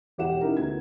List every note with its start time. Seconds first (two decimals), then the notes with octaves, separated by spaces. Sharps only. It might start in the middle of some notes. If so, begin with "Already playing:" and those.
0.18 E1 G4 C#5 F#5 E7
0.40 C#4 D#4 E4 A#4
0.57 D2 B3 G#6